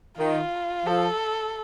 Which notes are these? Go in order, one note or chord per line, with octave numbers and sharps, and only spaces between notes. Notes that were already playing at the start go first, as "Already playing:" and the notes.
D#3 F4
F3 A4